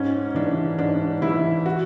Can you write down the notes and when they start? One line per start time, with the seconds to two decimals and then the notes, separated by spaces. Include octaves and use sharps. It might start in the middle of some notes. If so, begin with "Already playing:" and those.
Already playing: G#2 C#4
0.35 E3 D4
0.78 G#2 D4
1.22 E3 E4
1.66 F#4